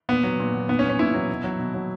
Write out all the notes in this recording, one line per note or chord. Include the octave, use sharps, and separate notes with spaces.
A#2 B3
F#3
A#2
F#3
A#2 B3
C#4
F#3
C#4
A#2 E4
F#3
B2
F#3
B2
F#3